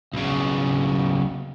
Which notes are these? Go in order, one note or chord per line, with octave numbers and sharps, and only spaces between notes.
B1 C#3